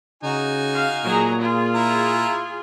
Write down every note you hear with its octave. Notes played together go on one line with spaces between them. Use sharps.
C#3 D#4 F#4 G#5
F5
A#2 F#3 G#4 A#5
F4 G#4
E4 A#5